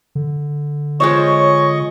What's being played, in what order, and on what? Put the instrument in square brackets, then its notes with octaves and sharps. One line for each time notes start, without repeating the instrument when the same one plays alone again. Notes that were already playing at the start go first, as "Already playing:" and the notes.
[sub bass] D3
[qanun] G#3 F4 C5 [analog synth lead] C#5 [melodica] D#5 C#6